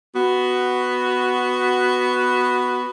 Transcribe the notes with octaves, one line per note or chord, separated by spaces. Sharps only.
B3 F#4